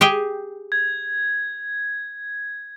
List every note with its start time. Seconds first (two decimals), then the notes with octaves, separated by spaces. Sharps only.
0.01 G4 G#4 G5
0.72 G#6